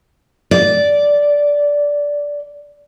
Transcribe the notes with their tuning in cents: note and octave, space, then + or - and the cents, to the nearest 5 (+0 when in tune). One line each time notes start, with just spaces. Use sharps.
D5 -10